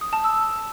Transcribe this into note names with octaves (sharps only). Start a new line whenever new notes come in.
D#6
A5
E6